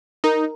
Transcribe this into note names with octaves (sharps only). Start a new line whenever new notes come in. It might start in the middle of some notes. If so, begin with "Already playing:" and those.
D#4 A#4